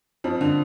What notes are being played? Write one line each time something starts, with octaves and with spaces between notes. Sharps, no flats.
F2 F3
D3